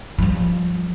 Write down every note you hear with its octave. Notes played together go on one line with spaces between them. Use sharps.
F3 G3